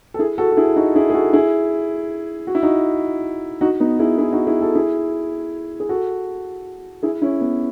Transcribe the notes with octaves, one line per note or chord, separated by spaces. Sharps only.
A4
E4 G#4
F#4 A4
F#4
E4 G#4
D#4 F#4
E4 G#4
G#4
F#4 A4
E4 G#4
F#4
E4
D#4 F#4
D#4 F#4
B3 D#4
E4 G#4
E4 G#4
D#4 F#4
E4 G#4
F#4 A4
E4 G#4
G#4
F#4 A4
E4 G#4
C#4 E4
B3